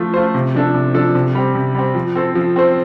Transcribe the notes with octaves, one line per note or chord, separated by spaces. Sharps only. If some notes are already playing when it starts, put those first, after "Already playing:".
Already playing: F3 A3 F4
A3 F4 C5
C3
F3 D4 A4
C3
F3 D4 A4
C3
G3 C4
C3
G3 C4
F3
C4 A4 C5
F3
C4 A4 C5